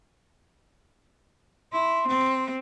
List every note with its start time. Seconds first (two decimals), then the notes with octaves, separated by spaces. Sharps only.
1.72 E4 C6
2.07 C4